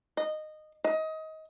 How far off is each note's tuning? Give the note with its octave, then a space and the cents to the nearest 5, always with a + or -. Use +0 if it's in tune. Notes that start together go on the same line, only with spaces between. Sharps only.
D#5 -15
D#5 +25